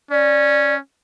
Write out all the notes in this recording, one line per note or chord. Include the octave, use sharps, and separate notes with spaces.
C#4 D5